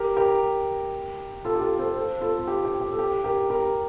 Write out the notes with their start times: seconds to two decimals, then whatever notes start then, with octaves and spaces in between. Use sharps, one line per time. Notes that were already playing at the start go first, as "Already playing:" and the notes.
Already playing: G4 A#4
0.17 G4 A#4
1.45 F4 A4
1.55 G4
1.62 F4 A4
1.79 A4 C5
1.96 A4 C5
2.21 F4 A4
2.39 F4
2.47 G4
2.65 G4
2.81 G4
2.92 A4
2.99 G4
3.24 G4 A#4
3.50 G4 A#4